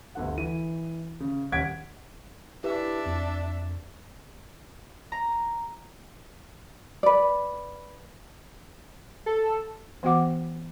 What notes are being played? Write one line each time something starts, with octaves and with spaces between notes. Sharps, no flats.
G1 D2 F#5
E3 D#7
C#3
D#1 C#4 F#5 G#6 B6 D7
D4 E4 G4 B4 E5
F2
A#5
B4 D5
A4
E3 B3 F#4 F#5 D6